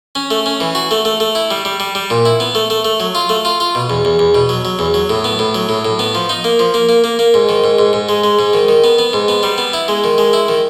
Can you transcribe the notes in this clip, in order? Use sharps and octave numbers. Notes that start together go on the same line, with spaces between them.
C#4
A3
C#4
E3
F#4
A3
A3
A3
E4
G3
G3
G3
G3
A#2
E4
B3
A3
A3
A3
F#3
F4
A3
F4
F4
B2
E2
E2
E2
B2
F#3
F#3
E2
F#3
A2
B3
A2
F#3
A2
A2
B3
F3
D#4
A#3
F3
A#3
A#3
A#3
A#3
G#2
D#3
G#2
G#2
G#2
G#3
G#3
G#2
D#3
D#3
B3
B3
G#2
B3
G3
B3
E4
G#3
D#3
G#3
E4
D#3